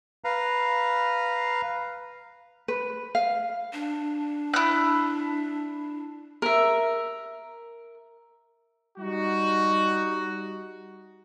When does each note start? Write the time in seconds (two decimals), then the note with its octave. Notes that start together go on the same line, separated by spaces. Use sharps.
0.24 B4 F5 A#5
2.68 B4
3.15 F5
3.73 D4
4.54 E4 F#6
6.42 A#4 E5
8.98 G3 D#4 F#4